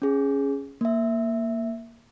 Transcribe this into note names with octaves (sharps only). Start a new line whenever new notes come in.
C#4 G#4
A#3 E5